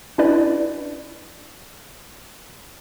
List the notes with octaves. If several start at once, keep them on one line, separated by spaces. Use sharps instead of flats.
C#4 D4 E4 B4 D5